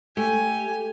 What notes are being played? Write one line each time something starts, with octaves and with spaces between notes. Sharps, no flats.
A3 G4 G#5